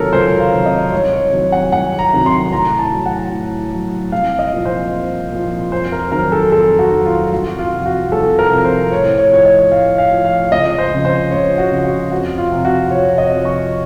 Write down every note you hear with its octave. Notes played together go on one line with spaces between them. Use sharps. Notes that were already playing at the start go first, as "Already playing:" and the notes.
Already playing: C#2 C3 D#3 F#3 A4 A#4 C#5
C#2 C5
F5
C3 D#3 F#3
D#5
C2 C#5
C#5
C3 D#3 F#3
F#5
C2 F#5
A#5
C3 D#3 F#3
C6
A2 A#5
A5
F#3
F#5
A2
F#3
C2 F5
D#5
A#2 F3
C5
C2
A#2 F3
F2 C5
A#4
D#3 F#3 A#4
A4
F2 A4
F#4
D#3 F#3
F4
C2 F#4
F#4
F4
C3 F3
F#4
C2 A4
A#4
C3 F3
C5
A2 C#5
C#5
F3 C#5
D#5
A2 F5
F5
F3
F5
C#2 D#5
C5
C#3 F3
C5
C#2 C#5
F#4
C#3 F3
F#4
F2 F#4
F4
C3 F3
F#4
F2 C#5
D#5
C3 F3
C#6